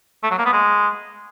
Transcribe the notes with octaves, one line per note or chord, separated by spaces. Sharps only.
A3
F#3
A#3
B3
G#3